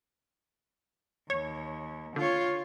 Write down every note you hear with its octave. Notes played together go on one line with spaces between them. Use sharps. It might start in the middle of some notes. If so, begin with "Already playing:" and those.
D#2 C#5
D3 F4 C#5